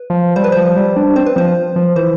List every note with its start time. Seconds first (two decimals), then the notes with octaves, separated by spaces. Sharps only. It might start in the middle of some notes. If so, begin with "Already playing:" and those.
Already playing: B4
0.10 F3
0.36 G3 C5
0.44 B4
0.52 F3 C5
0.76 G3
0.96 D4
1.16 C4 C5
1.26 B4
1.36 F3 C5
1.76 F3
1.96 E3 C5